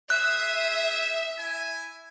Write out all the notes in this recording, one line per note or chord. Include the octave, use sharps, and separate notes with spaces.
G#4 C5 E5 D#6 F#6
E4 G#5